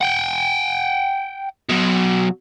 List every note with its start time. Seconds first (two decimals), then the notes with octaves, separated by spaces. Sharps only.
0.01 F#5 G5
1.69 B2 F#3